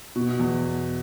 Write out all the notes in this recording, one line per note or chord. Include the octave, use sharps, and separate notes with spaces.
B2
E2